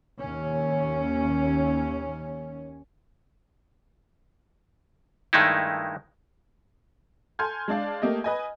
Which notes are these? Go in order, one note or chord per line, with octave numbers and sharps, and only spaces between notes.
D#2 C#4
G2 D#3 G#3 A3 D#4 E4
A4 G#5 C6 F6 G6 G#6
G#3 D4 D5 F5
A3 A#3 G4 D#5
B4 D#5 G#5